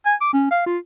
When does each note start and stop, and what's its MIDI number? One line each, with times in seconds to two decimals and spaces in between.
0.06 0.15 80
0.21 0.30 86
0.33 0.46 61
0.51 0.62 77
0.66 0.78 65